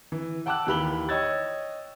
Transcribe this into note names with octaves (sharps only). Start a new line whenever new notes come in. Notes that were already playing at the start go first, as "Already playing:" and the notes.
E3
F#5 G5 A5 D6 E6 F#6
D#2 E3 G4 B5 F#7 G7
C#5 D#5 G5 E6 G#6 A6